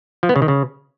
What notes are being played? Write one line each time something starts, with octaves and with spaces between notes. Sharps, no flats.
F3
B3
C#3
D#3
C#3